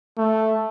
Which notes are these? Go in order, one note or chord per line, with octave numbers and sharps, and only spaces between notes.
A3